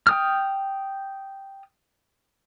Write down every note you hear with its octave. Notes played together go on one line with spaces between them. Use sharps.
G5 D#6 F6